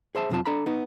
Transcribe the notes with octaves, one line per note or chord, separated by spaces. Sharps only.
G#4 C5 E5 A5
B1 F2 C3 F#3 F4 A5
D4 A4 A#5 B5
B3 D#4